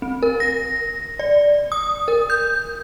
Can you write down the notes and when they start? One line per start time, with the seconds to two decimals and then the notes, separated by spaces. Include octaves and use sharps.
0.02 C4
0.23 A#4
0.40 A#6
1.19 D5
1.72 D#6
2.08 A#4
2.30 G6